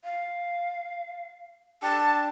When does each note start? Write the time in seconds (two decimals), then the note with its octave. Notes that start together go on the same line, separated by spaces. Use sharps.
0.04 F5
1.82 D4 G4 A5